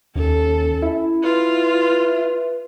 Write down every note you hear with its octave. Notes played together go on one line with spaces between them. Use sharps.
D#2 C#4 A4
E4
F4 B4